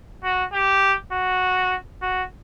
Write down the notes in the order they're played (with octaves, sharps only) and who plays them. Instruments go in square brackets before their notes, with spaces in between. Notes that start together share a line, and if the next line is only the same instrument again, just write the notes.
[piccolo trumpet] F#4
G4
F#4
F#4